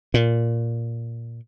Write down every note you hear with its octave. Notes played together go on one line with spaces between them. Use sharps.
A#2